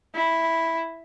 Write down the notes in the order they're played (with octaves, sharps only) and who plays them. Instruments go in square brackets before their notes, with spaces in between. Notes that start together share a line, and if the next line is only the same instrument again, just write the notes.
[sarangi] E4